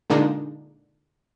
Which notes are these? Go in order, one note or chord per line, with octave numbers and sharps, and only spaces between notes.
A#2 D3 G#3 A#3 D4 D#4